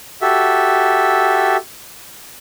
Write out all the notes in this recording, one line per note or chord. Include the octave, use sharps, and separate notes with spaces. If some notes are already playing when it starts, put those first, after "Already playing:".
F#4 G4 A4 E5